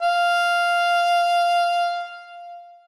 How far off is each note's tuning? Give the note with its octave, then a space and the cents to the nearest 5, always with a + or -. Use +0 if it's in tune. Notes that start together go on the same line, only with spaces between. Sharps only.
F5 -5